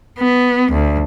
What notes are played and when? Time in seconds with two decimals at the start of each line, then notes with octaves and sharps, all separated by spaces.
0.19 B3
0.73 D2